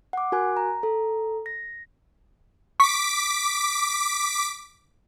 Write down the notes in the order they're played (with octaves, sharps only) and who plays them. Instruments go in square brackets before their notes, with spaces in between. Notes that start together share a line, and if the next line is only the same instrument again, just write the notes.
[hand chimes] F#5 D6
F#4 A#4 G#5 F#6
A#5
A4 A#5
A#6
[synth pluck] C#6 [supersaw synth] D6 B6